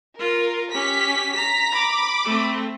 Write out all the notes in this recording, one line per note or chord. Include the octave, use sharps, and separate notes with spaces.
F4 A#4
C#4 G4 B6
A#5 B6
B5 D6
A3 C4